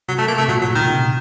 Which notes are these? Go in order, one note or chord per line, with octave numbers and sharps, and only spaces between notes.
C3 F#3
A3
A#3
C3 A3
A#2 F#3
A2 F#3
A#2 D#3
C#3
C3